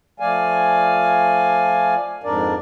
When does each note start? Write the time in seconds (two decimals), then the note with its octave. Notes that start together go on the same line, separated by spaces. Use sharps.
0.20 F3 A3 D5 F5 G#5
2.24 F2 G#2 D4 A#4 D5